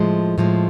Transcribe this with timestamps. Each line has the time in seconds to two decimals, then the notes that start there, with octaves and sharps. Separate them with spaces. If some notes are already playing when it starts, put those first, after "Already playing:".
Already playing: A2 F3 G#3
0.38 A2 F3 G#3